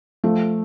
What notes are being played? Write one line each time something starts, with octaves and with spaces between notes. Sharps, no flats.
F3 A3